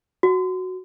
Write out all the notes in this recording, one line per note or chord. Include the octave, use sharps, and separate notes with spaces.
F#4